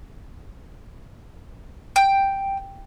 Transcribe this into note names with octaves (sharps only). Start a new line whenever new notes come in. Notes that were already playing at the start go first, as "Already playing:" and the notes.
G5